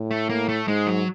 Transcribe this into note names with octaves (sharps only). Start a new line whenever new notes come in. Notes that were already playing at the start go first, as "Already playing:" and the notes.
Already playing: A2
A3
A#3
A3
G#2 G#3
F#3